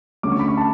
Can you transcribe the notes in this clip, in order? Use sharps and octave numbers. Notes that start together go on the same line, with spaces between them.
D2 D3 A3 C#4 D6
C#6
B5
C#6
A5